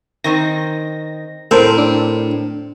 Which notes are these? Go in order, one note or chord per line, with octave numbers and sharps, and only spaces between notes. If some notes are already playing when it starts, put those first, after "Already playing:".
D#3 C4 D#4 A#6
A2 C4 A4 A#4 C5
D4